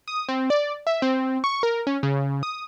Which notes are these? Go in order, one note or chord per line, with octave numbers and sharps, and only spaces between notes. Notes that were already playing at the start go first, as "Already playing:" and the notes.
D#6
C4
D5
E5
C4
C#6
A#4
C#4
C#3
D#6